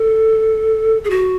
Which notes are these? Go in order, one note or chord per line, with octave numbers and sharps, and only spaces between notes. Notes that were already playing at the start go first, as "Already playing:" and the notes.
Already playing: A4
G#4
F#4